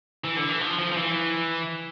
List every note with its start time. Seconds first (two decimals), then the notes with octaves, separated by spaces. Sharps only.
0.24 E3
0.36 D3
0.49 E3
0.61 F3
0.79 F3
0.92 F3
0.97 E3